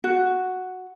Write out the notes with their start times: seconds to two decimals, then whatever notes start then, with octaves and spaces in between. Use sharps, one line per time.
0.04 F#4